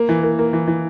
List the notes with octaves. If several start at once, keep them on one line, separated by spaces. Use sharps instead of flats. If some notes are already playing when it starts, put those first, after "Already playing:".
Already playing: A#3
E3
A#3
A#3
E3
E3